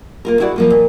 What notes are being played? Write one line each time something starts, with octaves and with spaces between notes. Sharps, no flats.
A#3 F4 A#4
E4 F#4 G#4 D5
F3 A#3 F4
A#2